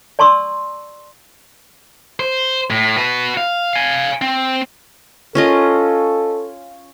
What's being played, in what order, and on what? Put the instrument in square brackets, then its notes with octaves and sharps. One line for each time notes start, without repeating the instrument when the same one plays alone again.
[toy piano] D5 A5 C6 C#6 E6
[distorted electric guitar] C5
A2
F#4 B4
F5
F5 G#5
C4
[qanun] C#4 F4 D#5 [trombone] A4